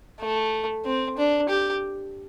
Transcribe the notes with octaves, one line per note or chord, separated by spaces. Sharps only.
A3
C4
D4
G4